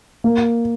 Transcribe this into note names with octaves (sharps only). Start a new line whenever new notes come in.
A#3